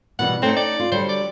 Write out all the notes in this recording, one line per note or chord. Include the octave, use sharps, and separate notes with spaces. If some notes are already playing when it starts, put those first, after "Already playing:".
B2 E3 G3 F#5
A3 C4 C#4 D#4
D5
F4
D3 F#3 G3 C5
D5